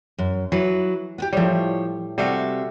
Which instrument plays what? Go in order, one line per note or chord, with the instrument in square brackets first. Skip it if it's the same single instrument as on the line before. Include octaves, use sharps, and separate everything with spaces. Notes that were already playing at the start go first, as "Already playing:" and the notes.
[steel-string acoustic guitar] F#2
[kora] E3 [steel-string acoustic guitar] F#3 B4
[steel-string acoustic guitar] B3 G4
[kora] A2 G3 [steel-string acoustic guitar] F3 C#5
[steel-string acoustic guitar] C3 E5 F5 [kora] G3 A3 F#4